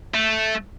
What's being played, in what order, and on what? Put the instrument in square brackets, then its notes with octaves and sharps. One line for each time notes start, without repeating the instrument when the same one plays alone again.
[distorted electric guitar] A3